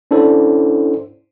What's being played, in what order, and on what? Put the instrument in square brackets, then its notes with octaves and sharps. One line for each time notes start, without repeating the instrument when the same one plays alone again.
[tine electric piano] C#4 D4 E4 A4 C5